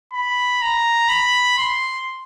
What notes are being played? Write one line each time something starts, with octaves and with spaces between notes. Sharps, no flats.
B5
A#5
B5
C6